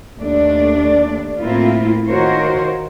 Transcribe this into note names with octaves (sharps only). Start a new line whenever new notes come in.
D#2 A3 D4 D5
A2 A3 A#3 C4 E4 F4
D#3 F4 F#4 A#4 C5 C#5